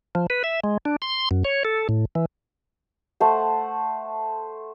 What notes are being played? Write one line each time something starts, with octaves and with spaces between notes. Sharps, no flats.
F3
B4
E5
G#3
D4
C6
F#2
C#5
A4
A2
E3
A3 C5 F#5